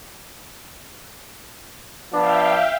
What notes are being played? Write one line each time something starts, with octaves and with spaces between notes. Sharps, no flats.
F3 B3 D4 E5 F5 G5